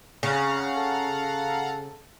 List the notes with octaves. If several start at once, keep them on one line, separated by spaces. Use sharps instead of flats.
C#3 F5 F#5 A#5
A4